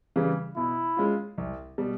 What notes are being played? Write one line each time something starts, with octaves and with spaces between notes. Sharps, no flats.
C#3 E3 G3
B2 E4
G#3 C#4 F4
C2
B2 G3